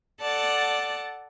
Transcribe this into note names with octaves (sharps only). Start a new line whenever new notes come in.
A4 D5 F#5 A5